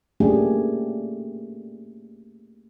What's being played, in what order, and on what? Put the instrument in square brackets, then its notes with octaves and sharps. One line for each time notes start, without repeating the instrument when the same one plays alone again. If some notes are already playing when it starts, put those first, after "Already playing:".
[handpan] A3 A#3 C#4 D4 G4 G#4